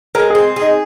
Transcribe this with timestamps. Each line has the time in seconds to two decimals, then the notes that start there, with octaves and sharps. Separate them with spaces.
0.15 G#3 A#4
0.30 G#4
0.35 C4
0.56 G#4
0.61 D#4